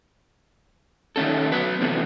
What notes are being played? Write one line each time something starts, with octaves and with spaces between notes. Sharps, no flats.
D#3 A3 C#4 A4
F#3 B3 B4
C3 E3 A3 B3